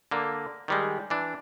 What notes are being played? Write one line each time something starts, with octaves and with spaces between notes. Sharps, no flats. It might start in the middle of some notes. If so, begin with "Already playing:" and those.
D3 A#3
D#3 G3 G#3
E3 D4